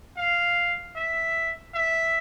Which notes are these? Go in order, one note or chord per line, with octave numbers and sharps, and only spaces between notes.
F5
E5
E5